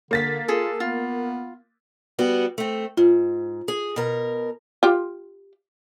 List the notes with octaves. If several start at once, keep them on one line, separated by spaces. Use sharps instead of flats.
D3 A#3 A6 B6
F4 G#4 A4
B3 F4
G3 B3 F#4
A3 C4
G#2 F4
G#4
B2 A#4 A#5
F4 G4